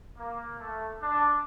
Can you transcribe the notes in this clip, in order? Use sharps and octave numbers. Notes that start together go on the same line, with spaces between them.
A#3
A3
D4